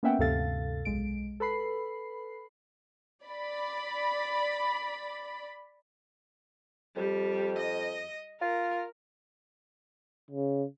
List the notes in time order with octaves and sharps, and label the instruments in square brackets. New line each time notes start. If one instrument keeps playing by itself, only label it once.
[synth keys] A#3 B3 C#4 E5 F#5 G5
D2 G2 C3 A4 F5 A6
B1 G#3 D7
A4 B4 B5 C7
[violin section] D5 B5
[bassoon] F2 [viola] G3
[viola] D#5
[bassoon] F4 [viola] A#4
[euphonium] C#3